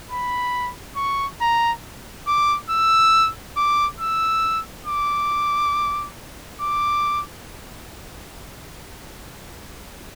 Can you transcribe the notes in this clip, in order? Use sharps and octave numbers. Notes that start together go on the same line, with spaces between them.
B5
C#6
A#5
D6
E6
D6
E6
D6
D6